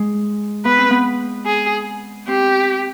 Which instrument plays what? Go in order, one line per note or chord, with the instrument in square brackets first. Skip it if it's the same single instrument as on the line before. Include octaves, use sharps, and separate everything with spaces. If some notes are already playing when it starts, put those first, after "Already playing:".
Already playing: [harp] G#3
[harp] B3 [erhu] B4
[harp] C4
B3
[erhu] G#4
[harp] C4 [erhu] G4